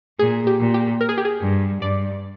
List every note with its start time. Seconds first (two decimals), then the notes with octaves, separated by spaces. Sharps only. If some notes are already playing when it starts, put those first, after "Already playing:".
0.19 A#2 G#4
0.47 G4
0.60 A#2
0.74 G4
1.01 A#4
1.09 G#4
1.18 G4
1.25 G#4
1.42 G2
1.81 G2 D5